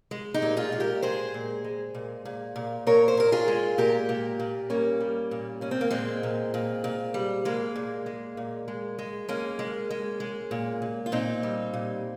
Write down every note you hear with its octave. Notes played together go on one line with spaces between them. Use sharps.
G#3
D#4 G4
A#2
F4 G#4
A#2
G4 A#4
G#3 G#4 C5
A#2
G#3
A#2
A#2
A#2
A#2 A#4 C#5
C5
A#2 A#4
F4 G#4
G#3
A#2 G4 A#4
A#2
A#2
G3 A#3 C#4
G3
A#2
A#2 C#4
C4
A#3
A#2 G#3 C4
A#2
A#2
A#2
G3
G#3 A#3
A#2
G#3
A#2
G#3
G#3
G#3 A#3 C#4
G#3
G#3
G#3
A#2
A#2
F4
A#2 C4 D#4
G3
A#2